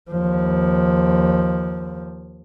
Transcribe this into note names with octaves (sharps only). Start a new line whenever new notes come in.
D#2 F3